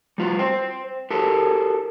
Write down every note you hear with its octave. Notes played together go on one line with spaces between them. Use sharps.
G3 F4 F#4
C5 G5
F#4 G4 A4 A#4